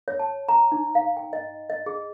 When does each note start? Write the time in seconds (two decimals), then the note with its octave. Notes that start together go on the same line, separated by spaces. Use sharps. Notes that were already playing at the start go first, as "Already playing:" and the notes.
0.08 C#5
0.19 A5
0.49 A#5
0.72 D#4
0.95 F5
1.17 G5
1.33 D#5
1.70 D#5
1.86 G#4